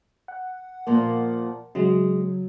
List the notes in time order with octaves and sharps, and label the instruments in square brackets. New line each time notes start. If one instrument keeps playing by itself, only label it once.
[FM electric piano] F#5
[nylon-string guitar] A#2 F3 A#3
[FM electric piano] C#3 F#3 [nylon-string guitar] G#3